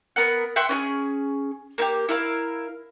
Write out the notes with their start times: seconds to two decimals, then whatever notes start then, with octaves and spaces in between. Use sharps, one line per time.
0.16 B3 A#4 F#5
0.56 E5 F#5 G5 C6
0.69 C#4 D#4 G#4
1.78 A#3 E4 G4
2.08 E4 A#4 F5